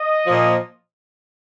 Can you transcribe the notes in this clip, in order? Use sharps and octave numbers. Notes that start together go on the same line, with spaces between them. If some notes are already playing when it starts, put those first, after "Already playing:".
Already playing: D#5
A#2 F3